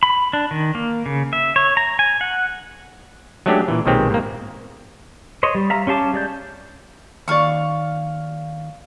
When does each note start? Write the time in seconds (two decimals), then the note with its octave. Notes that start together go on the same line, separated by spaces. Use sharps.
0.03 B5
0.33 D4
0.51 D#3
0.75 A#3
1.06 C#3
1.33 E5
1.56 C#5
1.77 A#5
1.99 G#5
2.21 F#5
3.46 F#3 G#3 A3 C#4 D4 G4
3.68 A#2 E3
3.86 B1 A#2 D#3 G#3 C4 G4
4.10 G#2 A#3
5.43 C5 C#5 D#5
5.55 G3
5.70 E5 F5 A#5
5.87 C#4 G4 F5 A5 D6
6.14 G#3 D5 G6
7.28 D#2 D#3 D5 F5 C#6